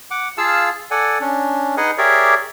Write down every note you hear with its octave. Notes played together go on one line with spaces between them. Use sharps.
F#5 D6
F4 G#4 F5 A5 E6
A4 D5 F#5 G#5
C#4 D4
D#4 G#4 B4 D#5 F#5 G#5
G4 G#4 A#4 C#5 D5 E5